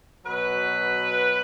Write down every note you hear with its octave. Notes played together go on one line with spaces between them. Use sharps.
B2 F#3 B4